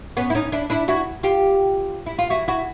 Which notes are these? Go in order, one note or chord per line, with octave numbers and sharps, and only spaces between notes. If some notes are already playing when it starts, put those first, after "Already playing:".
B3 C#4
E4
C#4 D#4
D4 E4
D4 E4
E4 F#4
F4 G4
E4
F4
E4 F#4
E4 F#4